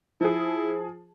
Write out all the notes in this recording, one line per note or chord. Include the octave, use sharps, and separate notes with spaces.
F3 E4 G#4